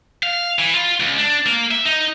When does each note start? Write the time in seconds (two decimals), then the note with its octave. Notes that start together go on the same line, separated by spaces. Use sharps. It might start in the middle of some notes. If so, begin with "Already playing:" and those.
0.23 F5
0.59 E3
0.74 F4
1.00 C#2
1.18 D4
1.46 A#3
1.71 E5
1.85 D#4